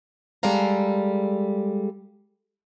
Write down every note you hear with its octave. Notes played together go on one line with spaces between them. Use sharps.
G3 G#3 A4 F5 A#5